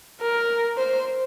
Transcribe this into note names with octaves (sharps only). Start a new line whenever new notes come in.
A#4
C5